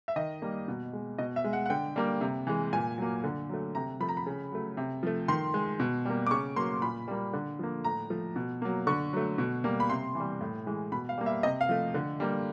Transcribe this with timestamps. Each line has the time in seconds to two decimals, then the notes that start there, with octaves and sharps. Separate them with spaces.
0.08 E5
0.16 D#3 D#5
0.42 G3 A#3
0.68 B2
0.93 G#3
1.18 B2 D#5
1.36 E5
1.44 G#3
1.53 F#5
1.66 F#5
1.70 D3 G5
1.96 G3 A#3
2.21 C3
2.47 E3 G#3
2.73 A#2 G#5
2.98 F#3 A#3
3.24 D3
3.49 F#3 A3
3.75 C3 A#5
4.00 F3 A3 B5
4.09 A#5
4.17 B5
4.26 C#3
4.52 F#3 A3
4.77 C3
5.03 F3 A3
5.28 D#3 C6
5.54 G#3
5.80 B2
6.05 G3 A#3
6.26 D6
6.31 C#3 C#6
6.56 F#3 A#3 C6
6.82 A#2 B5
7.08 G3 A#3
7.33 D3
7.59 F3 A#3
7.84 A2 A#5
8.10 F3 A3
8.36 B2
8.62 F#3 A#3
8.87 D3 C#6
9.13 F#3 A3
9.38 B2
9.64 G3 A#3
9.80 B5
9.90 C3 C6
10.15 E3
10.20 G3
10.41 A2
10.66 E3 G#3
10.92 B2 B5
11.09 F5
11.18 G3 A#3
11.26 E5
11.43 C3 D#5
11.61 F5
11.69 F3 A3
11.94 D3
12.20 G3 A#3